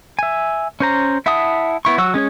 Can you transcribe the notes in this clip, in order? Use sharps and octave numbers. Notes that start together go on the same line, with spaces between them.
E5 G#5
C#4 C5 A#5
E4 E5 F#5 A5 D#6
B3 E4 C#6
F#3 F#4 E6
G#3 C#4 G#4 C#5